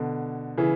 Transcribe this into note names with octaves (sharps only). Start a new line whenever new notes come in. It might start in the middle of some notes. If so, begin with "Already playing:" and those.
Already playing: B2 D3
C#3 E3